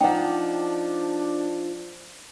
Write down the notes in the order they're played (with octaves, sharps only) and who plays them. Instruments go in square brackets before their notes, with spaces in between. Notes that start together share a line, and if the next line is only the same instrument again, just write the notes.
[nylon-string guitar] F3 D#4 [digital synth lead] D4 [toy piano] F#5 G5